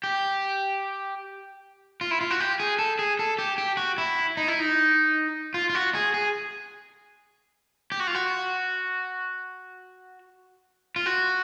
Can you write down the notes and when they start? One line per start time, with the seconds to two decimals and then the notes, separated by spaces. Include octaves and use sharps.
0.04 G4
2.01 F4
2.11 E4
2.21 F4
2.31 F#4
2.40 G4
2.60 G#4
2.79 A4
2.99 G#4
3.19 A4
3.39 G4
3.58 G4
3.77 F#4
3.98 E4
4.37 D#4
4.48 E4
4.60 D#4
5.54 F4
5.70 F4
5.75 F#4
5.95 G#4
6.14 G#4
7.92 G4
8.00 F#4
8.07 F4
8.15 F#4
10.96 F4
11.06 F#4